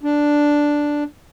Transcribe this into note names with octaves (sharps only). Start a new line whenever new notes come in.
D4